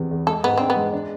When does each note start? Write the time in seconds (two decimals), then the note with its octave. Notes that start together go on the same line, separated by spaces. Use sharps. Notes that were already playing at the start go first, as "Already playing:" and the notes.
Already playing: E2 C3 E3
0.11 E2
0.27 G#3 A4
0.44 G#2 B3
0.57 C4 D4
0.70 B3
0.76 G#3
0.93 D4